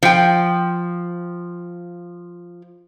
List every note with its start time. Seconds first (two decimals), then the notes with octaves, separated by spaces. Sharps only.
0.03 F3 G5